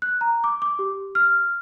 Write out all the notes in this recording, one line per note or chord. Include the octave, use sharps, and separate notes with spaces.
F#6
A#5
D6
D6
G4
F6